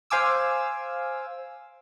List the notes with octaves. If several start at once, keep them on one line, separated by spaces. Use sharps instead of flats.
C5 F5 G#5 D6 E6